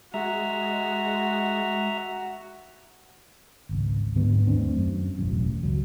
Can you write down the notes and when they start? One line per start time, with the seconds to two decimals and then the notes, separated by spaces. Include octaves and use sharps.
0.14 G#3 F#4 E5 A#5
3.69 G#1 C#2
4.16 G#2 D3 F#3 B3
4.46 D#2 A3 C4 D4
4.76 F#2
5.18 E1 A1 F#2
5.63 C#2 F#3